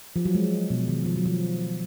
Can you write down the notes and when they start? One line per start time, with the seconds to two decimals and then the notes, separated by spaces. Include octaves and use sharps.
0.16 F3
0.25 F#3
0.35 G#3
0.70 B2
0.88 D#3
1.05 F3
1.16 F#3
1.26 F3